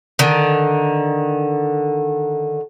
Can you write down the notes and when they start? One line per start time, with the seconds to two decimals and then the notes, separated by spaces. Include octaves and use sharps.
0.19 D3 D#3